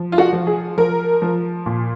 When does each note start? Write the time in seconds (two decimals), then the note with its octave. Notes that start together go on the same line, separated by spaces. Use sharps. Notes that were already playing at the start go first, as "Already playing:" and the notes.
Already playing: F3
0.12 F4
0.18 F#4
0.33 F3
0.47 G#4
0.78 F3 A#4
1.22 F3
1.66 A#2